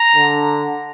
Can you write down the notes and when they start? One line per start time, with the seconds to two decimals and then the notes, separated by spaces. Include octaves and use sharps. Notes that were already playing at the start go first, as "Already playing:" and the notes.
Already playing: A#5
0.16 D3